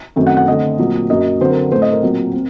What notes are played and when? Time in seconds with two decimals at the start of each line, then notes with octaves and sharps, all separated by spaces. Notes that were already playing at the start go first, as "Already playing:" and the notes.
0.16 F#2 D#3 A3 C4
0.27 F#5
0.37 F#5
0.48 D3 A3 C4 D#5
0.79 A#2 F#3 C4
1.09 F#2 F#3 A#3 D#5
1.41 D3 F#3 C4 C5
1.51 A#4
1.71 A2 A3 C4 C5
1.82 D#5
1.93 A#4
2.03 A#2 F#3 C4
2.33 C4